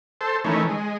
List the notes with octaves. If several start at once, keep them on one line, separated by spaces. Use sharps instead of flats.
A4 C5
D#3 E3 A3 C#4
G#3